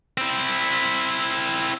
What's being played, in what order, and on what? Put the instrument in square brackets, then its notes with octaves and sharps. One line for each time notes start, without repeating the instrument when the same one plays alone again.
[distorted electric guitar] C4 E4